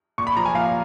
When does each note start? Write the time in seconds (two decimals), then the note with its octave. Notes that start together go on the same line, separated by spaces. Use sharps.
0.18 A#2 C#6
0.27 B5
0.37 F3 A#5
0.46 G#5
0.55 A#2 F5